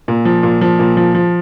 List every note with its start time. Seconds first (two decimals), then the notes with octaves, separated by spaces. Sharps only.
0.08 A#2
0.25 F3
0.43 A#2
0.61 F3
0.79 A#2
0.97 F3
1.15 F3